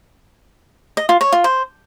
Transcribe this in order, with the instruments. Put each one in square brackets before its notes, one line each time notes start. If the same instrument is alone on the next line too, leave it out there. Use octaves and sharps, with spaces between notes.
[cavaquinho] D#5
F4
C#5
F4
C5